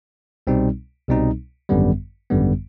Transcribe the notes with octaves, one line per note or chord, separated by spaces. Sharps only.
C2 B2 G3 C4 D#4
C2 B2 G3 C4 D#4
G#1 F#2 D3 G3 B3
G#1 F#2 D3 G3 B3